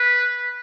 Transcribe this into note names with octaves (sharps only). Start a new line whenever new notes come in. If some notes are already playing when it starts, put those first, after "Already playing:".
Already playing: B4